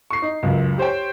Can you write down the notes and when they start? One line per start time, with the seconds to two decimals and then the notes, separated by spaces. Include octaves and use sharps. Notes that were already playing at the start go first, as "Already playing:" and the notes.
0.10 C#6 C7
0.22 D#4
0.43 C#2 F#2
0.78 G4 C5 C#5 G5